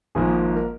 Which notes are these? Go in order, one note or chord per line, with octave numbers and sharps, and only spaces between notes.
G#1 G#2 F3 A#3 G#4
A#4